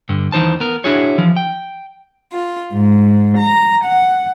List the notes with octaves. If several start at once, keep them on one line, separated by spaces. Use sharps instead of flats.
G2 D3
D#2 E3 D#4 C5 A5
B3 A#4
D4 E4 F#4 G#4 C#5
E3 F3
G5
F4
G#2
A#5
F#5